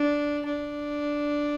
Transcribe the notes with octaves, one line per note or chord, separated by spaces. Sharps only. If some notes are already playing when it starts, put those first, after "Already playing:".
Already playing: D4
D4